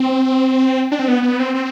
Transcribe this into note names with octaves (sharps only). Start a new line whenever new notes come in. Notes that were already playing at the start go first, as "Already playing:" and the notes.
Already playing: C4
D4
C4
B3
B3
C4
C4